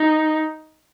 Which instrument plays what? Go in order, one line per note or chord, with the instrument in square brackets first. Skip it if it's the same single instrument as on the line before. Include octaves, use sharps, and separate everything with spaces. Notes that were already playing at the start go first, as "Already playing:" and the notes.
Already playing: [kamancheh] D#4